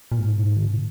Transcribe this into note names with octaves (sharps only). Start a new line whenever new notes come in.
A#2
G#2
D#3
C#3
A#2